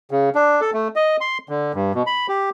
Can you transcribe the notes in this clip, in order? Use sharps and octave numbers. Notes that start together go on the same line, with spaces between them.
C#3
D4
A4
A3
D#5
C6
D3
G2
B2
B5
G4